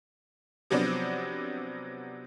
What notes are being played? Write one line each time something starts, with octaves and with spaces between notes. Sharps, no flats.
C3 F3 F#3 B3 C4 D4